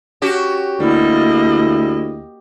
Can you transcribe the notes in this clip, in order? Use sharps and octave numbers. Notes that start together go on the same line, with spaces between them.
C#4 F#4 G4
D2 G3 A#3 E4 D#5